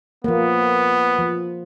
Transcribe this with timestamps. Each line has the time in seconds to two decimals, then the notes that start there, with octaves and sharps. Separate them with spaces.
0.24 F3 A#3 B3
1.19 F3